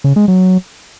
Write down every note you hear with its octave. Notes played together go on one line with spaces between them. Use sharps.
C#3
G#3
F#3